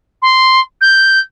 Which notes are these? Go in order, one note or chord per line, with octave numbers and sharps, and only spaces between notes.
C6
G6